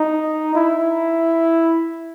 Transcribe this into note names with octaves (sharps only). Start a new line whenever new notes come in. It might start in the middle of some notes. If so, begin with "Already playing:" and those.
Already playing: D#4
E4